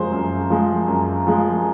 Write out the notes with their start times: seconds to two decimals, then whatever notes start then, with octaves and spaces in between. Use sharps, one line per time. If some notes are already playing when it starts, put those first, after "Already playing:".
Already playing: F#2 F3 G#3 C5
0.12 F#2
0.50 F3 G#3
0.88 F#2
1.27 F3 G#3